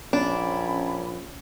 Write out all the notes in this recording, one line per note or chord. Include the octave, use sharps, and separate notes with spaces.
A#1 C#4 D4 C#5 B5